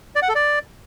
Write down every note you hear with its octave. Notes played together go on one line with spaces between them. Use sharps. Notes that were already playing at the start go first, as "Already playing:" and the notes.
D5
F#5
A4
D5